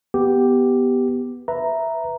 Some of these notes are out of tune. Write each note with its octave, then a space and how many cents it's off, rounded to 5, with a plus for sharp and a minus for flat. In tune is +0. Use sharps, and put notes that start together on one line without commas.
B3 +0 G4 +0
B4 +0 E5 +0 A#5 +0